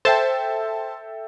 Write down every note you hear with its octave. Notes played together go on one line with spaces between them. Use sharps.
A4 C5 E5 G5 A5